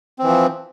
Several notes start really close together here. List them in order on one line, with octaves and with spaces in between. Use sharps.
C4 E3 F3